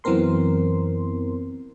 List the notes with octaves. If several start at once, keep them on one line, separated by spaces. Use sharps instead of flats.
F#2 E3 B3 C4 A#4 C6